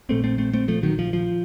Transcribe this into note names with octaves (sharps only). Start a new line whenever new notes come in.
A#1 A#2 A3 C4
A3 C4
A3 C4
A3 C4
F3 A3
D#3 F#3
F3
F3